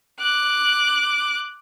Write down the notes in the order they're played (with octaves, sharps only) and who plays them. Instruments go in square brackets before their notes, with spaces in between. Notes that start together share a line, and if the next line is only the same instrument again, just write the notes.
[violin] D6 F#6